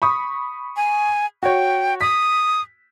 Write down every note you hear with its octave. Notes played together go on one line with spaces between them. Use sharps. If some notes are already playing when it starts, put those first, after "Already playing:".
B5 C#6 D#6
G#5
F#4 C#5 G5
D#6 B6